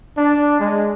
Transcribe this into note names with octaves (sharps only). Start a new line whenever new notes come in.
D4
G#3